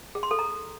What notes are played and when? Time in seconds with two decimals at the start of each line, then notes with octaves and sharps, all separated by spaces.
0.15 G#4
0.23 C6
0.31 A4
0.39 A#5